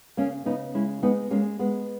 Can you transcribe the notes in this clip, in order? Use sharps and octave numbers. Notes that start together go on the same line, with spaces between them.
C#3 A#3 C#4
C#3 B3 D#4
G#3 C#4 E4
G#3 B3 D#4
G#3 A#3 C#4
G#3 B3